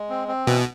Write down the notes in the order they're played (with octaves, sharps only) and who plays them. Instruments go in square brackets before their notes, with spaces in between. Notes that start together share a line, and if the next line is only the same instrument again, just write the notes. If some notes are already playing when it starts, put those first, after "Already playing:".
Already playing: [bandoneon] G#3
C4
C4
[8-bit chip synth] B2 [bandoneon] E3